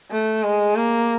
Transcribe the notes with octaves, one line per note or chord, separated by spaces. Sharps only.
A3
G#3
A#3